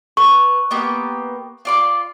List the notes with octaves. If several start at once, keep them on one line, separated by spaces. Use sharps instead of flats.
B4 C#6
A#3 B3 G4
F4 D5 C6